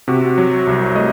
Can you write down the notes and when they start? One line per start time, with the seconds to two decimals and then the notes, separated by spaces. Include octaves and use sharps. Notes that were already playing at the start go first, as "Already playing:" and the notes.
0.08 C3 F#4
0.38 F#3
0.67 C2
0.95 A3 D#5